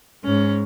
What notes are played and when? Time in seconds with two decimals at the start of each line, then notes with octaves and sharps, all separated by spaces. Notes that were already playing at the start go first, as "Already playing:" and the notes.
0.24 G#2 C#4